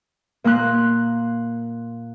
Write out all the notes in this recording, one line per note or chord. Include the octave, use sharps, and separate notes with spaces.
A#2 A#3 C6 F#6